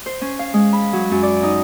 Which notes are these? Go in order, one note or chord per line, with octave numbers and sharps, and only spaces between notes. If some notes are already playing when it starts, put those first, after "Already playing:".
C5
C#4
F5
G#3
B5
F#3
F#2
D5
D#4